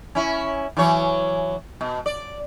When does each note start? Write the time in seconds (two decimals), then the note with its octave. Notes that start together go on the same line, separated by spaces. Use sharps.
0.15 C#4 E4
0.77 E3 F#3 C#5
1.81 B2
2.06 D5